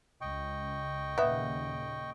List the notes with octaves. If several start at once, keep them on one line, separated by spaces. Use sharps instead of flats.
C#2 D#5 G5 C#6
D#2 A#2 C#3 B3 E5